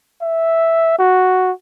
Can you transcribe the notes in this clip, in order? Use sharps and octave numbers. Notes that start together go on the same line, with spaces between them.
E5
F#4